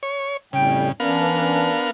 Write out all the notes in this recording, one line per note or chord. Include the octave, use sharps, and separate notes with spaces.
C#5
F2 A2 C#3 G3 G5
E3 B3 C#4 D4 A#4 F5